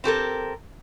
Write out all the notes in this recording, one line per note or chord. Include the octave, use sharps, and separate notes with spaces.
C4 G4 A4 A#4